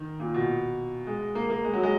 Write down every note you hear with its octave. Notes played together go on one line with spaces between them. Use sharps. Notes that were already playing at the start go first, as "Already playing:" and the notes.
Already playing: D#3
A#2
B2
G#3
A#3
A#3
G#3
F#3
G#3